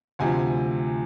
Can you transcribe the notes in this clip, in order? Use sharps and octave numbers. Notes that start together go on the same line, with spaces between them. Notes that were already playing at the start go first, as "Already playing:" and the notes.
D2 C3 F3 G#5